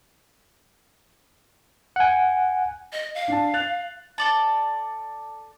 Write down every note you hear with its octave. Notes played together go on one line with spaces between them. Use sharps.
F#5 G#5
D#5
F5
D4 A5
F#6 A6 F7
A4 D5 A5